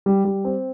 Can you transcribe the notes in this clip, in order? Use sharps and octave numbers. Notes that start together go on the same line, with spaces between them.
G3
G3
C4